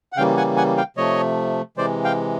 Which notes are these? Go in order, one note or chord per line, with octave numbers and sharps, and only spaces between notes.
F#5
C#3 E3 G3 A#3 F5 G5
F#5 G#5
F#5 G#5
F5 G5
C3 F3 A3 C#5 D#5
C3 E3 G#3 C5 D5
F5 G5